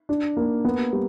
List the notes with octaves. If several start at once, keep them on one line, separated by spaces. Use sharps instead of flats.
D4
A#3
B3
G3